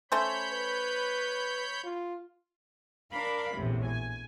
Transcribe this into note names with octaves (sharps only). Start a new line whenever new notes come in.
A3 C#4 C5 C#5 B5 G6
B4
F4
D4 A#4 F5 B5
A#1 E2 A2 C3
G#5